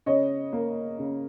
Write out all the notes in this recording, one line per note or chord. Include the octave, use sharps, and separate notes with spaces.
C#3 C#5 D#5
A#3
C#3